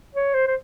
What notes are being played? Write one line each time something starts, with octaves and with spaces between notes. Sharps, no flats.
C#5
C5
C5